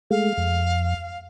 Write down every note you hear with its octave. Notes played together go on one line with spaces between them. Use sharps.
G#3 A3 F5
F2